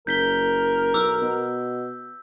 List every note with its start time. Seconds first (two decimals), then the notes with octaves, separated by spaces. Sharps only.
0.07 F#1 A#4 G6 B6 G7
0.94 B1 D6 E6
1.22 B2